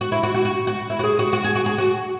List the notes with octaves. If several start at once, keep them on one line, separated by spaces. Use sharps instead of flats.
F#4
E4
F#4
F#4
F#4
F#4
E4
F#4
G#4
F#4
F#4
G#4
F#4
G#4
F#4